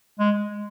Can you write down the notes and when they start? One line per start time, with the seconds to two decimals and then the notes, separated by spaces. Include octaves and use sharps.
0.19 G#3